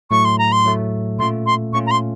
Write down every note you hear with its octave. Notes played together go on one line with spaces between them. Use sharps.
A2 F#3 A3 C#6
C6
A#5
C6
A2 F#3 A3
A#2 A3 C#4 F4 C6
C6
A#2 A3 C#4 F4 C#6
A#5
C6